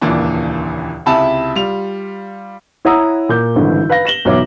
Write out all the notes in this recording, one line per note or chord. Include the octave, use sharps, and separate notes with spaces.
D#1 C#2 A#2 E3 A#3 D4
C#2 C3 E4 E5 A5 B5
G3 F4 F7
E4 C#5 F#5 A#5 D#6 E6
A#2 D6 G6
G#1 G2 D3 E3
B4 F5 A#6
A#6 E7 F#7 G7
B1 E2 C#5 E5 D6